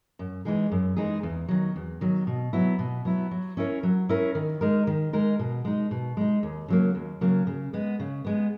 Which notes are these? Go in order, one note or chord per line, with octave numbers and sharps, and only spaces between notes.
F#2
E3 G#3 D#4 G#4
F#2
E3 G#3 D#4 G#4
E2
D#3 F#3
E2
D#3 F#3
B2
F#3 B3 E4
B2
F#3 B3 E4
F#3
C#4 E4 A#4 C#5
F#3
C#4 E4 A#4 C#5
D#3
G#3 D#4 A#4
D#3
G#3 D#4 A#4
B2
G#3 D#4
B2
G#3 D#4
D#2
C#3 F#3 A#3
D#2
C#3 F#3 A#3
C#3
G#3 B3
C#3
G#3 B3